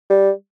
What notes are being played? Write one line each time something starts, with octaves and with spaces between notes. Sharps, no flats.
G3